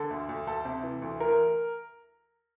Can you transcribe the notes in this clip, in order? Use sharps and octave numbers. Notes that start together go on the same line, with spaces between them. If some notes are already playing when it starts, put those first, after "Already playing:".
Already playing: D3 A4
D2
D2
D2 A4
C3
E3
D2
E3 A#4